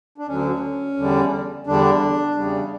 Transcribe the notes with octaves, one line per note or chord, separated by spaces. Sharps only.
D4
D2 D3 F#3 C#4
E2 D3 G3
E2 D3 G3 D4
E2 C#3 G3